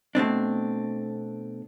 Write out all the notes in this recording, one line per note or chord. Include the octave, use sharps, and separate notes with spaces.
B2 A3 C4 D4